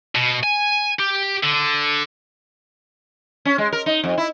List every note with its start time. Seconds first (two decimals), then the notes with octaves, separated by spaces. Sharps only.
0.15 B2
0.43 G#5
1.00 G4
1.43 D3
3.45 C#4
3.58 G#3
3.73 A#4
3.86 D#4
4.04 F2
4.18 E4